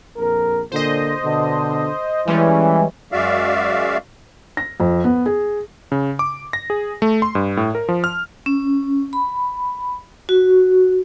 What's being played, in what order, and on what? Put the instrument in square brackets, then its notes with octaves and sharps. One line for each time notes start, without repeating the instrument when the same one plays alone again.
[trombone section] A#1 F2 A#4
[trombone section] A#2 D3 [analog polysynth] C5 D#5
[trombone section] B2 D3
[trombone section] E3 [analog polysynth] G3 G#3 C#4
[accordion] F#2 G#3 F#4 D5 E5 F5
[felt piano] A#6
F2
B3
G#4
[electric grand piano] C#3
D6
A#6
G#4
A3
C6
G2
A2
A#4
F3
F6
[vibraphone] C#4
B5
F#4